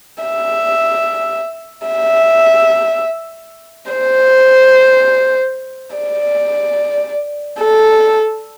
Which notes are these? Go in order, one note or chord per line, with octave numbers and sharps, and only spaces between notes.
E5
E5
C5
D5
A4